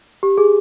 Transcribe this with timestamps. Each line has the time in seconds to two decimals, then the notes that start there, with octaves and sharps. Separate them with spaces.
0.23 G4
0.38 G#4